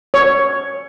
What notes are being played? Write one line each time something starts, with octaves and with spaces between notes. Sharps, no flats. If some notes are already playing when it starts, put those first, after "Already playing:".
C#5